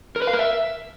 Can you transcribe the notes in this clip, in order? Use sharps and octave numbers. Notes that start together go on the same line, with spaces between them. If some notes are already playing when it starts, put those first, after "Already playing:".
A#4
B4
F5
A#4
E5